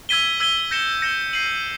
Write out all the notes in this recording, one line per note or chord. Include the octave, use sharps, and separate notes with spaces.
E6 G#6 B6 D#7 G7
E6 G#6 B6 D#7 G7
G6 A#6 C#7 E7 G7
G6 A#6 C#7 E7 G7
G6 C7 D#7 F#7